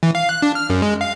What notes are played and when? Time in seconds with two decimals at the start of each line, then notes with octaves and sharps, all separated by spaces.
0.03 E3
0.15 F5
0.29 F#6
0.42 D4
0.55 F6
0.70 F#2
0.82 G#3
1.01 F5